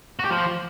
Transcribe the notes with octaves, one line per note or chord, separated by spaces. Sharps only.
F#4
G4
F3